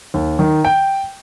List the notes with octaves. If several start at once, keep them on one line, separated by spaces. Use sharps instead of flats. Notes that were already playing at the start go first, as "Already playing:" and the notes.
D#2
D#3
G5